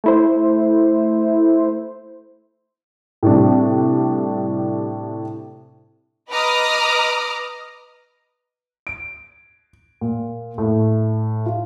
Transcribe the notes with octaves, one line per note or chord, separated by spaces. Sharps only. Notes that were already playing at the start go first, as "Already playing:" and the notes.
A3 E4 C5
A2 C3 G3 D4
B4 D#5 A#5 D6 D#6 F6
D7
A#2
A2
F4